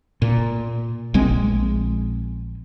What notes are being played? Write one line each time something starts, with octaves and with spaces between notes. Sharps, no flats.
A#2
A#1 G#3 C4